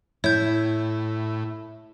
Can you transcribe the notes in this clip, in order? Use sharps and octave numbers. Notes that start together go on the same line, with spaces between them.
A2 E4 C#5 G6